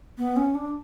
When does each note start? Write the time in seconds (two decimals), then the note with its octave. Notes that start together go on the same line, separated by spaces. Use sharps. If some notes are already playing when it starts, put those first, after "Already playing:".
0.18 B3
0.36 C#4
0.55 D4